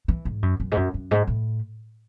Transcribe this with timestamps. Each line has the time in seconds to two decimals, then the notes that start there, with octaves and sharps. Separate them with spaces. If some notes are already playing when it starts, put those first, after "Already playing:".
0.08 E3
0.25 G#2
0.43 F#2
0.60 F#2
0.72 G#2
0.77 F#2
0.94 F#2
1.11 G#2
1.27 A2